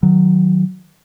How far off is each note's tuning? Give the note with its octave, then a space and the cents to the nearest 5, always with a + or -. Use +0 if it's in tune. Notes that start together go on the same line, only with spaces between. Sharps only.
D#3 +0 F#3 +0